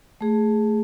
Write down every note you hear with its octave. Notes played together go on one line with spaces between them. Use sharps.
A3 G#4